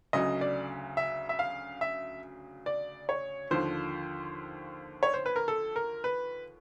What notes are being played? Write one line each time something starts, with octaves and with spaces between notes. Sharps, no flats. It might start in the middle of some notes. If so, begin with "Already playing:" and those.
D2 C#3 F#3 D#5
D5
E5
E5
F5
E5
D5
C#5
D#2 D3 F3 C5
C#5
C5
B4
A#4
A4
A#4
B4